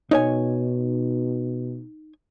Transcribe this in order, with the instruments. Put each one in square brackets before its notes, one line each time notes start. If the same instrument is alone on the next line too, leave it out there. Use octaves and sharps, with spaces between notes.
[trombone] B2 [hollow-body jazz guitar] D#4 C#5 G#5